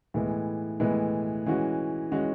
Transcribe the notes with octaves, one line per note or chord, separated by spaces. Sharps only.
A2 E3 G#3 B3
A2 E3 G#3 B3
E3 G#3 C#4 F#4
E3 G#3 C#4 F#4